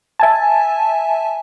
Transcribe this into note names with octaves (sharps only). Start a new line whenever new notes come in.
E5 G#5 A5